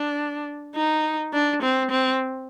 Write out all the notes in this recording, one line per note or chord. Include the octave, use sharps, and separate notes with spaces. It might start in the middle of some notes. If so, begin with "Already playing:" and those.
Already playing: D4
D#4
D4
C4
C4